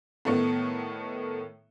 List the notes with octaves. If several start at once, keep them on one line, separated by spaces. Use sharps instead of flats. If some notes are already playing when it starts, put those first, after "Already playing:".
A2 D#3 A3 B3